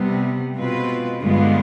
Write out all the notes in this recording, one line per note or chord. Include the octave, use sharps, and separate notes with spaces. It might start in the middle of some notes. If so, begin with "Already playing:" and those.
Already playing: C3 G3 B3
B2 G#3 C4 F4 B4
G2 D3 G#3 B3 F4